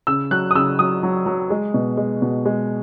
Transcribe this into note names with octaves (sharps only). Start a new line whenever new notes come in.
C#3 E6
F#3 F#6
D#6
C#3 E6
F#3 D#6
F#3
F#3
G#3
B2
G#3
B2
G#3